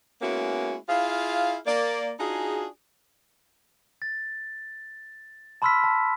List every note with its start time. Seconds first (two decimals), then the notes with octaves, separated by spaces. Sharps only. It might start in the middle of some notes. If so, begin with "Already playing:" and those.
0.22 G#3 A#3 B3 C#4 E4 F#4
0.89 E4 F4 G#4 F5
1.66 A#3 D5
2.19 D4 D#4 F4 F#4 G#4
4.02 A6
5.62 A5 B5 C6 E6 F6 B6
5.84 A5